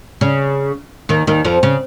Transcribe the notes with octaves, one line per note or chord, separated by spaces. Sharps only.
C#3
D#2 D#3
D#2 D#3
F2 F3
C#3